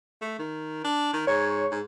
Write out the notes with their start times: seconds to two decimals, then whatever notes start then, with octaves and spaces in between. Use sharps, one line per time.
0.21 A3
0.39 D#3
0.84 D4
1.13 D#3
1.27 G#2 C#5
1.71 G#2